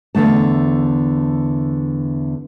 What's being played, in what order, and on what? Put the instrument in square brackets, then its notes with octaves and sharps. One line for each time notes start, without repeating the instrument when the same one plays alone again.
[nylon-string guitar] E2 D3 A3 A5